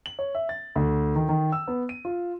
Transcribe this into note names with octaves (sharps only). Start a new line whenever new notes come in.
F#7
C#5
E5
A6
D2
D#3
D#3
E6
B3
D#7
F4